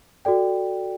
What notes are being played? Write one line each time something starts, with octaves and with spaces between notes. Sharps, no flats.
F#4 A4 D5 G5